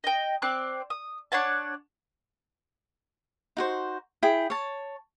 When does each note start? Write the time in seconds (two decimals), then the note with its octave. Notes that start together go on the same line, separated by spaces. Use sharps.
0.04 D#5 G5
0.42 C4 D5 D6 F#6
0.90 D#6
1.32 D4 C#5 F#5 A5
3.57 D#4 F#4 C5
4.22 E4 G#4 G5
4.50 C#5 A5